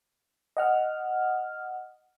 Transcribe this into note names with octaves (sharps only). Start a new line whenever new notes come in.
D#5 F#5 F6